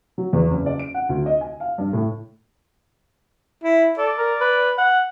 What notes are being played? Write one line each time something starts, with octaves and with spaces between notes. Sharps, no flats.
F#3
E2
F#1
D5
D7
F#5
D2
D#5
G#5
F5
G2
A2
E4
A4 D5
A#4
B4
F#5